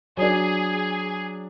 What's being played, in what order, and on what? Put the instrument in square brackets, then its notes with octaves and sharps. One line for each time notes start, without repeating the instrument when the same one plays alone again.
[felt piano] F#3 D4 [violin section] G#4